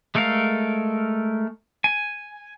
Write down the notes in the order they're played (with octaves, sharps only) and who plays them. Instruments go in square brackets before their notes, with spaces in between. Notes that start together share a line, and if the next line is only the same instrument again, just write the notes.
[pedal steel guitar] G#3 A3 A4 A#4 F5
G#5